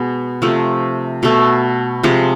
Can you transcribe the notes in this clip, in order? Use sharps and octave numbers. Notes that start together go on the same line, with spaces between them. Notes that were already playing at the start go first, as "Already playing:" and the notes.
Already playing: B2 G#3 B3 B4
C3 F3 A3
B2 A3
C3 F3 G#3 C5